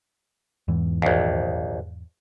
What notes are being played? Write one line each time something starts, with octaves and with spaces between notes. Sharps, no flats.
E2 G#2 E3
A#1 D#2